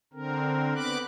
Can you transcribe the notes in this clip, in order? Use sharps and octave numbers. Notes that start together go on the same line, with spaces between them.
D3 C4 A#4
B3 B5 D6 F#6